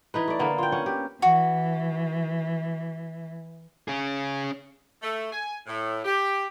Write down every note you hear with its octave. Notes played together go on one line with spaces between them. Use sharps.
E3 D#4 B4
A3 D5
D3 A#3 B3
F4 G5
C#4 F#5
G4
E3 F#4
C#4 G#4
A3
G#5
A2
G4